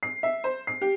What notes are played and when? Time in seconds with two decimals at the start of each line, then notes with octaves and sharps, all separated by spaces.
0.03 C7
0.23 E5
0.44 C5
0.67 C7
0.82 G4